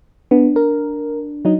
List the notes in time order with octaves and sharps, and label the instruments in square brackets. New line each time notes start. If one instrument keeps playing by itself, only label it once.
[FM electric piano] B3 [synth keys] D4
[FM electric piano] A#4
F#3 D#4